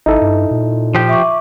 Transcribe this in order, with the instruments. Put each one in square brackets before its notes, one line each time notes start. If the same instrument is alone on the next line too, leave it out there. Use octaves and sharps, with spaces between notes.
[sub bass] G#1 [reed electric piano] D#4 E4 A4
[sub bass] G2
A#2
[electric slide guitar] F3 G4
[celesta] E5 C#6 D6